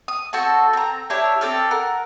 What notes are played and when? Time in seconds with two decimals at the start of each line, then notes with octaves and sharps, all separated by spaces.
0.08 D#6
0.33 C4 F#4 A4 A5
0.73 C4 A#5
1.10 D4 E4 G4 C#5
1.41 C4 D4 A4 F6
1.71 A#4 F#5